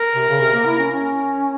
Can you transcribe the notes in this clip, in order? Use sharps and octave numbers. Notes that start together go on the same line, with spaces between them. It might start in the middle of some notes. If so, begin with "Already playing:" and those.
Already playing: A#4
C3
C#3
C3
A#3
E4
C#4
C#4